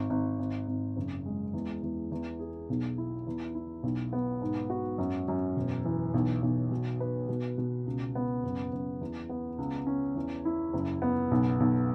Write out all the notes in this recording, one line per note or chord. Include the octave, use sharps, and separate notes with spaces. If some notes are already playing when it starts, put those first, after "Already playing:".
Already playing: G#1
G#1
G#1
G#1
F#1
G#3
E2
E2
E2
G#4
B1
E4
E2
E4
B1
B3
G#2
F#4
F#2
F#2
E1
E3
B1
B1
B2
B4
B2
B2
C#2
B3
F#1
F#1
E2
B3
C#2
C#4
E2
E4
F#1
B3
B1
B1